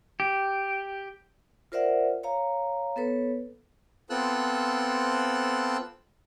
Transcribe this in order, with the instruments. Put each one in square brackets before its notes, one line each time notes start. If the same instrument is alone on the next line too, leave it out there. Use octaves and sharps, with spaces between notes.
[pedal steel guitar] G4
[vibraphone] F4 A#4 C5 D5 E5 F#5
C#5 F5 A#5
B3 A4 B4 C#5
[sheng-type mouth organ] B3 C4 F4 A4 E6 F#6